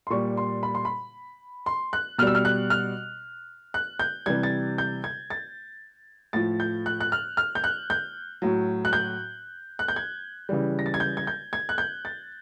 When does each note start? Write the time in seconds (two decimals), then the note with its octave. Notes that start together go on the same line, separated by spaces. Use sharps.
0.07 C6
0.10 A#2 G3 C#6
0.37 C6
0.63 B5
0.75 C6
0.85 B5
1.66 C6
1.93 F#6
2.18 B2 G3 F6
2.27 E6
2.35 F6
2.45 F#6
2.70 F6
3.74 F#6
4.00 G6
4.26 C3 E3 G3 G#6
4.43 A6
4.78 G6
5.04 G#6
5.30 A6
6.33 A2 F3 A6
6.60 G6
6.86 F#6
7.00 F#6
7.12 F6
7.37 F6
7.55 G6
7.64 F#6
7.90 G6
8.42 A2 F#3
8.85 F#6
8.93 G6
9.79 F#6
9.88 G6
9.96 G#6
10.49 C#3 E3 G3
10.79 A#6
10.86 A6
10.94 G#6
11.00 G6
11.17 G#6
11.27 G6
11.53 G#6
11.69 F#6
11.78 G6
12.05 A6